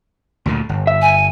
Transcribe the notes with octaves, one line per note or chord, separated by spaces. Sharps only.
D2 A#2 D3
G1
E5
G#5